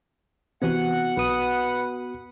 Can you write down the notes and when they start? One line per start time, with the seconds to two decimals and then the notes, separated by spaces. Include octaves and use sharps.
0.62 C3 E3 B3 F#4 F#5
1.17 B1 B4 D#6 D#7